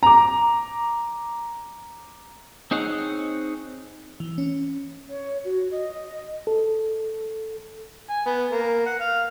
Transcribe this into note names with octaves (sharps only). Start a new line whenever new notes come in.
A#5 D6
C4 D#4 G#4 C#5 F#5
E3
C#4
C#5
F#4
D#5
A4
G#5
B3
A#3
F#5
F5